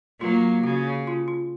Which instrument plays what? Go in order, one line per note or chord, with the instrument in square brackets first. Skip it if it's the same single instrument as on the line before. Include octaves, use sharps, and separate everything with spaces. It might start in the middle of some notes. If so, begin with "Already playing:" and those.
[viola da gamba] F#3 A#3 [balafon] F4
[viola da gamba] C#3 [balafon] F#4
[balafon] F4
F4